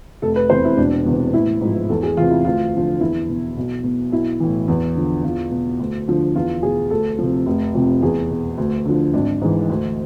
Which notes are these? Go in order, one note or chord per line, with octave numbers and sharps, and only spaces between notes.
F1 A4
B4
E2 C3 C5
E4
E1 D4
E2 C3
A1 E4
G#2 F3
E2 A4
G#4
C3 E3 F4
E4
D2 F4
D3 F3
E2 E4
B2
B1
B2
B1 E4
A2 E3
E2
D3 F3
E2 F4
B2
D2
D3 F3
E2 F4
B2 G#4
D2 A4
C3 F3
F1
F2 C3
E2 G#4
B2
D2
D3 F3
G#1 D4
G#2 E3
D2